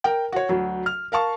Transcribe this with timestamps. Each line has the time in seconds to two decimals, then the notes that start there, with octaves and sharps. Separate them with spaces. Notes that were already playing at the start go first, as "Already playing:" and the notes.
0.04 A#4 G5
0.32 F#4 C#5
0.49 D2 F#3
0.86 F6
1.12 A#4 F5 A5 C#6